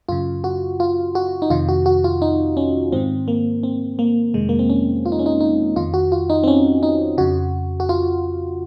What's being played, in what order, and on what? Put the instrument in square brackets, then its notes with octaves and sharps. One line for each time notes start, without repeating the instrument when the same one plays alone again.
[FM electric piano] F#2 C#3 F4
F#4
F4
F#4
D#4
F2 C3 D#3 F4
F#4
F#4
F4
D#4
C#4
G#2 D#3 C4
A#3
C4
A#3
F2 C3 D#3 G#3
A#3
C4
C#4
F4
D#4
C#4
D#4
D#4
F2 D#3 F4
F#4
F4
D#4
C4
C#4
D#4
F2 C#3 F#4
F#4
F4